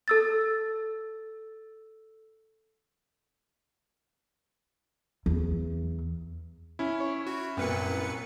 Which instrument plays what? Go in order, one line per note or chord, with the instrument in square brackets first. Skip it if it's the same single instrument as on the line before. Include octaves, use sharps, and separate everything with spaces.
[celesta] A4 E6 A6
[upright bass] E2
[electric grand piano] C#4 E4
[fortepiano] C#5
[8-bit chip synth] F#4
[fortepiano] C2 A#2 [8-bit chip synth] F#2 B4 C#7